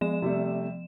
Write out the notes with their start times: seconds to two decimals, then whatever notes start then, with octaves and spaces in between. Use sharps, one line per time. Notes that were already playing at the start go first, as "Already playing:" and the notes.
0.01 F3 G#3 E7
0.22 C3 G3 A3